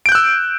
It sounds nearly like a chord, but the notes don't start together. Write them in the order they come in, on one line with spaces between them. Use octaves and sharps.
D7 G6 F#6 E6